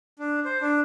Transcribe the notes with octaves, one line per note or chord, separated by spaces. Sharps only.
D4
C5
D4